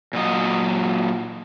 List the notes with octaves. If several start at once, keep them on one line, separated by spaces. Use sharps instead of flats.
A#2 F#3 D#5